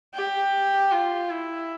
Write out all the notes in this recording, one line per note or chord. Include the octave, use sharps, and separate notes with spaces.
G4
F4
E4